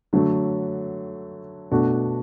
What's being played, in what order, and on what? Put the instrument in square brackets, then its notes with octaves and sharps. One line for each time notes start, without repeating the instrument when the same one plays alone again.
[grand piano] D3 F#3 A3
B2 A3 D4 F#4